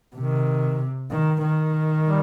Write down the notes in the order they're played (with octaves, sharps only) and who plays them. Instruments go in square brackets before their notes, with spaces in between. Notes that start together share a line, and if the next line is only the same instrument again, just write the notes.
[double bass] C3 [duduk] D#3
[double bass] D#3
D#3
[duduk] G3